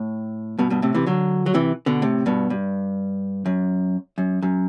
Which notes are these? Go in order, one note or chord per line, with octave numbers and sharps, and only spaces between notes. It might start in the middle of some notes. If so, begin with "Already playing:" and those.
Already playing: A2
G2 B2
G2 B2
A2 C3
C3 E3
D3 F#3
F#3
C3 E3
B2 D3
A2 C3
G2 B2
G2
F#2
F#2
F#2